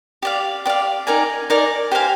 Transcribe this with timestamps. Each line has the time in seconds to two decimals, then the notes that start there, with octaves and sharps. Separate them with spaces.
0.22 G4 D5 F5
0.65 G4 D5 F5
1.07 D#4 A#4 D5 G#5
1.50 D#4 A#4 D5 G#5
1.92 G4 C5 F5 G#5